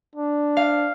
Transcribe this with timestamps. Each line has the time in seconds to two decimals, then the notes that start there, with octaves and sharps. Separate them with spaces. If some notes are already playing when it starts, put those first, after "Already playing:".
0.15 D4
0.57 F5